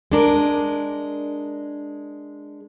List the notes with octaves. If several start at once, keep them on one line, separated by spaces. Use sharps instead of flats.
G#3 D4 A#4